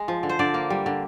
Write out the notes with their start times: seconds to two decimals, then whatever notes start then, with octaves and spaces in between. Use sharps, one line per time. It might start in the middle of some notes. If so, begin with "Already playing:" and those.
Already playing: G#3
0.08 F3
0.23 D3
0.29 C5
0.39 D3 D5
0.54 A#3
0.70 G3
0.86 D3